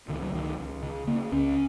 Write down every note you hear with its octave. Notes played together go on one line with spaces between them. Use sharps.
C#2 D#3
F#3
C#2 D#3
C#2
C#3
C#3 A#3
C#2 C#4